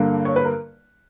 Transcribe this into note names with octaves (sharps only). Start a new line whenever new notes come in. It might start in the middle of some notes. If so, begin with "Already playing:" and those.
Already playing: G2 D3 A#3
C#5
B4
A#4